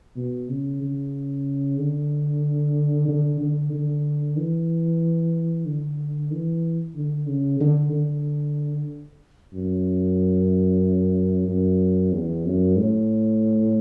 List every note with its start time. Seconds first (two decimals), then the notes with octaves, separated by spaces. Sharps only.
0.16 B2
0.49 C#3
0.82 C#3
1.79 D3
3.08 D3
3.40 D3
3.73 D3
4.37 E3
5.66 D3
6.32 E3
6.95 D3
7.28 C#3
7.60 D3
7.92 D3
9.54 F#2
11.48 F#2
12.13 E2
12.46 F#2
12.78 A2